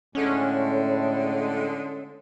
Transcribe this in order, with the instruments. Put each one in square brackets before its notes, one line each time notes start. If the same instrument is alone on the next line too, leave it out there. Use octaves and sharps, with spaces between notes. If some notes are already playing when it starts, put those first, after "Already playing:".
[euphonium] A2 [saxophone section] D3 G#3 [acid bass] C#4